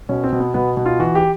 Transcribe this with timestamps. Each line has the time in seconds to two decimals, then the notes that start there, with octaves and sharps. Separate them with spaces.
0.09 B2 C#4
0.24 C4
0.32 B2
0.40 B3
0.54 B2 B3
0.77 B2
0.86 F4
1.00 E3 F#4
1.15 G4